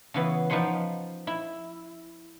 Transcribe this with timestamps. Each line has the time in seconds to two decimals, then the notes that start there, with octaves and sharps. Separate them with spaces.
0.14 C#3 E3 B3
0.50 F3 D#4 B4 F#5 C6
1.27 E4